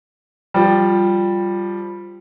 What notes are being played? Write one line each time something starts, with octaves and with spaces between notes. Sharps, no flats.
F3 G3